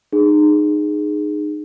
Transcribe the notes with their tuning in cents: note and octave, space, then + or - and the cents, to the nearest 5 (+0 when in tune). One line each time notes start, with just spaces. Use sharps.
D#4 -30 G#4 +0